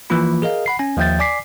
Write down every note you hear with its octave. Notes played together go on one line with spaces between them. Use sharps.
E3 F3 A#3 F4 B5
G#4 A#4 D#5 F5
F#5 B5 C7
C#4 G#5
D#2 F3 E5 G5 G6 A6
D5 G#5 D6 B6 C7